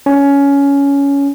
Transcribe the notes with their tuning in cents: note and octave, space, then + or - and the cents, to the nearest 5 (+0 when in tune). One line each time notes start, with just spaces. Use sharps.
C#4 +15